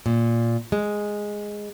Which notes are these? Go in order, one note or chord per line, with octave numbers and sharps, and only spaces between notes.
A#2
G#3